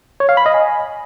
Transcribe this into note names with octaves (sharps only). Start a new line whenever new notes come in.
C#5
F5
B5
D#5
G#5